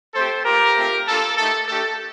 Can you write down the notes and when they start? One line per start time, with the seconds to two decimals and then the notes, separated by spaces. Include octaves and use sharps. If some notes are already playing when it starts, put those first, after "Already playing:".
0.15 A3 C4 G4 A4 C5
0.45 A#3 F4 G4 A#4
0.76 A3 C4 F4
1.08 A#3 D4 F4 A4
1.38 A3 D#4 G4 A4
1.68 A3 D4 G4 A4